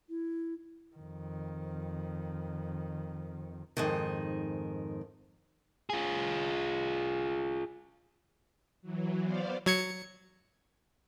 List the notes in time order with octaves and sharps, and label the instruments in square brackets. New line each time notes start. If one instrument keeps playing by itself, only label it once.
[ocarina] E4
[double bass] F2 D#3
[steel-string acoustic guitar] F2 G#2 D#3
[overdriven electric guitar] F4 G#4
[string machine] E3 F#3
B3 C5 D5 F5
[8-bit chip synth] F#3 G#6 C#7